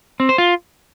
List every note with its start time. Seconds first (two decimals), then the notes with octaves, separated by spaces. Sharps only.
0.20 C4
0.29 C5
0.38 F4